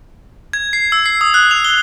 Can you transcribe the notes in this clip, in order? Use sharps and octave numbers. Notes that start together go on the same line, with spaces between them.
G#6
C7
E6
C7
D#6
F#6
F7
G7